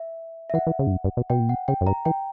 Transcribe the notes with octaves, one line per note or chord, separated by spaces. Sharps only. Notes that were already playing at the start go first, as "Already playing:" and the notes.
Already playing: E5
E5
E3 F#5
E3
C#3
G2
F#2
G2
B2
B2 G5
A#2
B2 F#5
C#3 G5
F#2
G2 A#5
E3 G5